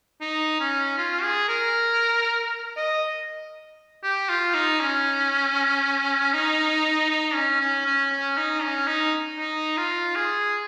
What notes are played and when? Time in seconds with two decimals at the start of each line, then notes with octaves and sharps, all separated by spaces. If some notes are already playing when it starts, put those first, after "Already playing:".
0.21 D#4
0.60 C#4
0.98 F4
1.23 G#4
1.49 A#4
2.77 D#5
4.04 G4
4.29 F4
4.54 D#4
4.81 C#4
6.34 D#4
7.10 D#4
7.35 C#4
7.61 C#4
7.86 C#4
8.12 C#4
8.37 D#4
8.63 C#4
8.88 D#4
9.38 D#4
9.77 F4
10.16 G#4